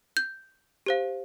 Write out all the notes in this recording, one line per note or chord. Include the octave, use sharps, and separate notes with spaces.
G6
G4 C5 F5